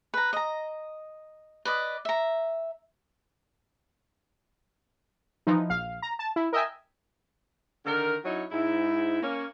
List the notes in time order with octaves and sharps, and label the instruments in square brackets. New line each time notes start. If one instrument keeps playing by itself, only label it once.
[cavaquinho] B4 A#5
D#5 A#5
B4 D5 D#5
E5 A#5
[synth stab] E3 F3 D#4
A#1 F5
A#5
A5
E4
A#4 D#5 E5 G5 G#5
[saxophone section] D3 D#3 A#4
F#3 C#4 D#4 E4 C#5
G#2 E4
A#3 C#4